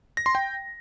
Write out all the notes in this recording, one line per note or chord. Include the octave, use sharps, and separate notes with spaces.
A#6
C6
G5